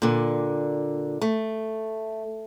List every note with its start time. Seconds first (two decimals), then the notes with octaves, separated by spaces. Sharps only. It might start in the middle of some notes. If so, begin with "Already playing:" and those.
0.02 A#2 D3
1.21 A3